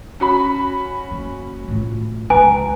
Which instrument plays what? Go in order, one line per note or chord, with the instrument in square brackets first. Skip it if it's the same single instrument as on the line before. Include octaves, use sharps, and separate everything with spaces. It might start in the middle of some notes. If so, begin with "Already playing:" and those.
[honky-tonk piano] C#4 F#4 B5
[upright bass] F#1
A2 F4
[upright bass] C#2 D3 [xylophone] B4 A#5 [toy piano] G#5